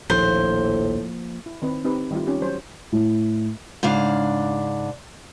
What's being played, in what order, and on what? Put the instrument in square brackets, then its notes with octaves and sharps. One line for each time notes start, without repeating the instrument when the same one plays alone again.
[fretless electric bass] A#1 D#2 [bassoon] A2 [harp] F3 A#3 G6 [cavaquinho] C5
[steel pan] E4
D#3 C4 B4
C4 D#4 G4 B4
D#3 G3 A3 E4 F4
C#4 D#4 F4 G4
F#3 C5 C#5
[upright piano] A2
[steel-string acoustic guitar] G#2 C#3 D4 F5